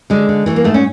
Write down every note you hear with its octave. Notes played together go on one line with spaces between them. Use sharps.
D3 G#3
D3
E3 A3
A#3
G#2 A3
C#4